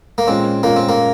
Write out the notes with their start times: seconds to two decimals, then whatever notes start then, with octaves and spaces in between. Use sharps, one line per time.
0.18 A#3
0.27 A#2 G#3 C4 C#4
0.63 A#2 G#3 A#3 C#4
0.76 C4
0.89 A#3